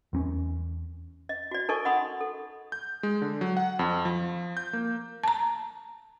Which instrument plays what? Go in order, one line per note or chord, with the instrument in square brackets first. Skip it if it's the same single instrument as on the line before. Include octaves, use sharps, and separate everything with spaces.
[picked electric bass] E2 C4 C#4
[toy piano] D#5
F#4 D5
D#4 A4 A#4 D#5 G#5 C#6
D#5 F#5 B5 C6 D#6
A4
[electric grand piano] G6
G#3
D3
F#3
F#5
F2
F3
G6
A#3
[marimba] A5 A#5